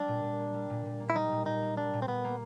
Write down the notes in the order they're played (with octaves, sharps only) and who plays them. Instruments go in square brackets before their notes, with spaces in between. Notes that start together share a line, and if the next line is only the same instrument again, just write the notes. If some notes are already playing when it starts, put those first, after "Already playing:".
Already playing: [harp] G3 [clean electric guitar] D4
[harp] A#2
A#2
A#3
G3
A#2
A#2
A#3
[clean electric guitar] E4
[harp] G3 [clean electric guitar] D#4
[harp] A#2
[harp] A#2 [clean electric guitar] D#4
[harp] A#3
[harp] G3 [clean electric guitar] D4
[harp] A#2
[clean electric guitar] C4
[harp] A#2 [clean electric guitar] B3
[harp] A#3